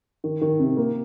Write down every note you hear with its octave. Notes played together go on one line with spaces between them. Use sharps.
D#3
D#3
C3
A#3